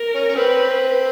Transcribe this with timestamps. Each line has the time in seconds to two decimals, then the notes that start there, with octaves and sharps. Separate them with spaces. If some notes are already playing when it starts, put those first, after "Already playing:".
Already playing: A#4
0.14 C#4
0.28 C#4
0.36 C4 B4